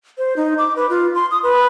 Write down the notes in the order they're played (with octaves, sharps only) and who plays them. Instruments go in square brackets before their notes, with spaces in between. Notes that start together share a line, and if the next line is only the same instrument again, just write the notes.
[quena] C5
D#4
D6
B4
F4
C6
D#6
B4